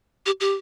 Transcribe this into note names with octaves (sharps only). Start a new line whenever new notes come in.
G4
G4